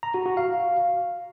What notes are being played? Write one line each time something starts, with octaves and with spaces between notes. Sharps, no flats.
A#5
F#4
F#4
F5